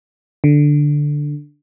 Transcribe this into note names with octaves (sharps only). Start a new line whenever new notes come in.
D3